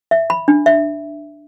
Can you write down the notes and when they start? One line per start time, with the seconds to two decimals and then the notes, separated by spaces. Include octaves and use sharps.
0.11 E5
0.30 B5
0.48 D4
0.66 E5